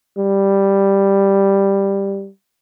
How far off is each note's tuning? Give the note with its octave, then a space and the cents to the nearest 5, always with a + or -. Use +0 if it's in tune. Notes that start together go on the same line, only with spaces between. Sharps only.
G3 +5